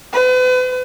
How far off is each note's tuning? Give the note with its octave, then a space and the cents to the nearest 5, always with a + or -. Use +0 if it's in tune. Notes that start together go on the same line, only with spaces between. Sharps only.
B4 +40